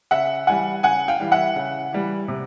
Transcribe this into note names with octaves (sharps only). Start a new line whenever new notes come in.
C#3 E5 F#5
E3 G3 F#5 G#5
C#3 F#5 G#5
F5 G5
E3 G3
E5 F#5
C#3
E3 G3
C3